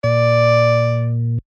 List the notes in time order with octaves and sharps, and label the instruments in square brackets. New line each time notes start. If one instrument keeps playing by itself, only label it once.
[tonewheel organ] A#2 [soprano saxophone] D5